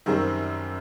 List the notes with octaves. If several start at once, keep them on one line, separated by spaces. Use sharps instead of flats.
F#2 D#3 G3 C4